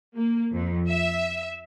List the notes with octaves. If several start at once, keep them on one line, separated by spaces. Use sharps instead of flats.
A#3
F2
E5